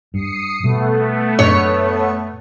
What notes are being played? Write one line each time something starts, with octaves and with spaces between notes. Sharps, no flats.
G2 D#6 C7 C#7
B2 G3 A3 B3
F#2 A#2 D4 C#5